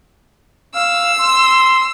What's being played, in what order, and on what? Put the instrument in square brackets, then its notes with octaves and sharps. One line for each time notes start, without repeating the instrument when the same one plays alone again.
[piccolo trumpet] F5 [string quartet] E6
[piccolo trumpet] C6